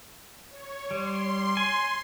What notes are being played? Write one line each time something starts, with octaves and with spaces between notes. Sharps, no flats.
C#5
G3 C6
G#5